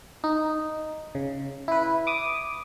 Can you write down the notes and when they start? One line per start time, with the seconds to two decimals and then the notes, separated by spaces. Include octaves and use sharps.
0.24 D#4
1.15 C#3
1.68 E4 B4
2.07 D6 D#6